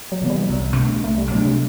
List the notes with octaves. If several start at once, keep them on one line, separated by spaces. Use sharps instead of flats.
F#3
C3 E3 B3
G3
C2
B2 A3 D4
C2 A3
G3
B2 F#3 A3 D4
C3